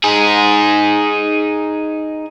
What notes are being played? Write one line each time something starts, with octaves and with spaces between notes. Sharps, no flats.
D#4 G#4